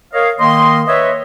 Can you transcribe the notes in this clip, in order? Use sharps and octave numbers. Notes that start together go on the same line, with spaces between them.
A#4 C#5 D#5 F5
D#3 A#3 D#5 C6
B4 C#5 D#5 E5